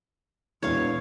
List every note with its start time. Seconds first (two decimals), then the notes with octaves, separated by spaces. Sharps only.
0.63 E1 E2 A#2 C#5 F5